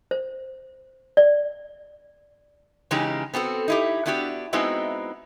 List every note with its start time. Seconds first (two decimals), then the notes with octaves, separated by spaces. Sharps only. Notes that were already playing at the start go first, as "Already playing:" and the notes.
0.11 C5
1.17 D5
2.91 C#3 E3 G#3 C#4 D#4 G4
3.34 B3 C4 F#4 A4
3.68 D#4 E4 G4
4.06 B3 D4 E4 F#4 G4
4.53 G#3 B3 C4 D#4 E4 F#4